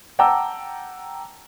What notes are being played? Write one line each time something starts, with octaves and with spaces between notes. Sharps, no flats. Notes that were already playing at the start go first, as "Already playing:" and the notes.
F#5 G5 A5 A#5 D6 E6